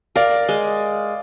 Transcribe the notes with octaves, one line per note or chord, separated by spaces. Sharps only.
A#4 D5 F5
G#3